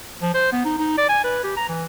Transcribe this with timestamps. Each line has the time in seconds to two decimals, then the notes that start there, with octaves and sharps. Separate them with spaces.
0.22 F3
0.34 C5
0.52 B3
0.65 D#4
0.78 D#4
0.98 D5
1.09 G#5
1.24 B4
1.44 G4
1.57 A#5
1.69 E3